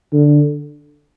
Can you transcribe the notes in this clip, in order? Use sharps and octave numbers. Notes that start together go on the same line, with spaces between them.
D3